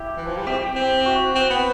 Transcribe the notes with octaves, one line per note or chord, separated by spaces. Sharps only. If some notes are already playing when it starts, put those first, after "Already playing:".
Already playing: E4 G4
E3
F3
G3
C4 G4
C4
F#4
C4
B3